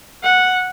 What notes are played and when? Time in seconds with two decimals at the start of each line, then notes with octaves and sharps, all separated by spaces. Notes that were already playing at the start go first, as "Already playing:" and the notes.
0.24 F#5